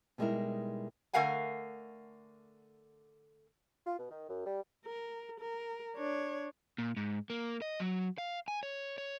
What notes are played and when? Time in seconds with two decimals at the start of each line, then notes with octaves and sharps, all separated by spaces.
0.18 B2 G3 G#3 D#4 E4 A#4
1.13 D3 A3 A#4 F5 F#5 G#5
3.87 F4
3.98 B2
4.10 D#3
4.28 F#2
4.45 G3
4.85 A#4
5.40 A#4
5.96 D4 C#5
6.78 A#2
6.97 G#2
7.30 A#3
7.62 D#5
7.80 F#3
8.18 F5
8.48 G#5
8.63 C#5
8.98 C#5